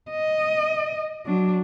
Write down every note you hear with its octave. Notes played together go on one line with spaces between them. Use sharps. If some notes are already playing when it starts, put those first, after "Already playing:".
D#5
F#3 D4